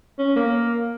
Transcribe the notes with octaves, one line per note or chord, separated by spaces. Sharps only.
C#4
A#3